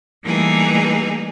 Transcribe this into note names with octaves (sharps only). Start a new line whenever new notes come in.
E3 G3 A3 A#3 D#4 G#4